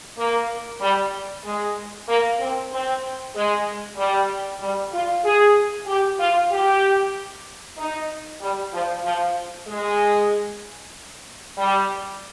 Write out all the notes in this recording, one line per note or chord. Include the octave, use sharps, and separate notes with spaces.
A#3
G3
G#3
A#3
C4
C4
G#3
G3
G3
F4
G#4
G4
F4
G4
D#4
G3
F3
F3
G#3
G3